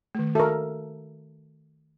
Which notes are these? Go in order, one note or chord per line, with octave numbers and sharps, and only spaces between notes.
D#3 A3
F#4 A4 A#4 E5